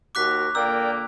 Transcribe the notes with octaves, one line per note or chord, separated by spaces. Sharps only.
D#2 F#4 A#4 D6 F#6 B6
A#2 D3 A#3 A#4 D5 G5 E6